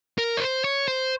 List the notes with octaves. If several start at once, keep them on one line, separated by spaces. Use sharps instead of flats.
A#4
C#5
C5
C#5
C5